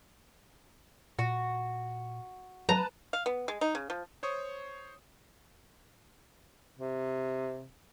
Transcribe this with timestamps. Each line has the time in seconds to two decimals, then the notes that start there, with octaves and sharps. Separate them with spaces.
1.19 A#2 F#4
2.69 F#3 B4 A5 A#5
3.13 F5
3.26 B3
3.48 G#3
3.61 D#4
3.75 C#3
3.90 F3
4.23 C5 C#5 C#6 D#6
6.79 C3